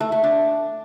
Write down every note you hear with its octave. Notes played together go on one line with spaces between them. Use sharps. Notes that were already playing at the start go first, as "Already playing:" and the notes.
A3
A3
D4